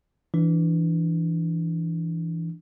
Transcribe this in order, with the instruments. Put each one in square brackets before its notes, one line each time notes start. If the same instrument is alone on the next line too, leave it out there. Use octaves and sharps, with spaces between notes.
[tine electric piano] E3 D4